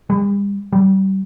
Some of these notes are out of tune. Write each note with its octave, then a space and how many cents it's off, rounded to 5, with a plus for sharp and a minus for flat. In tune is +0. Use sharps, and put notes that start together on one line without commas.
G3 +40
G3 -30